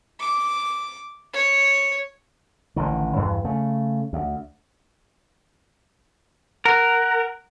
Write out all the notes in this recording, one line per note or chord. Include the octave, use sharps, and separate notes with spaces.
D6
C#5
A1 D3 D#3
E2 G2
C#3 A3
D2
A#4 F#5